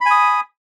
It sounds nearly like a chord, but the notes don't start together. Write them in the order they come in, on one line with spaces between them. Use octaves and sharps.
B5 G#5 D#6